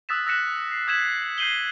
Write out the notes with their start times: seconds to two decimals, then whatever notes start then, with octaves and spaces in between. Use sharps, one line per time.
0.09 D#6 E6 F#6 A6 B6 E7
0.26 E6 F#6 A#6 B6 C#7 E7
0.72 C7
0.87 D#6 G6 G#6 B6 E7 F#7
1.38 G6 C7 D#7 F#7 G7